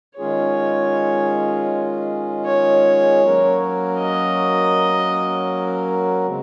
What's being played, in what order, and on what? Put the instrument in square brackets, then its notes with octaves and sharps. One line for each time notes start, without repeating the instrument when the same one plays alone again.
[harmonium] D#3 G#3 C#4 F4 G#4 [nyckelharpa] C#5
[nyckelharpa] C#5
[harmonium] F#3 A#3 C#4 F#4 A#4
[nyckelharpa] D#5
[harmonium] C#3 G#3 C4